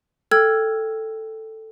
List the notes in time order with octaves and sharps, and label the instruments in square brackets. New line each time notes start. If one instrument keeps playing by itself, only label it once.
[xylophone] A4 G5 E6 F6 G#6